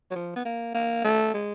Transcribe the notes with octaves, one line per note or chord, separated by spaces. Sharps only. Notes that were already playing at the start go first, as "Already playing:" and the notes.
F#3
F3
B3
A#3
A#3
A3
G#3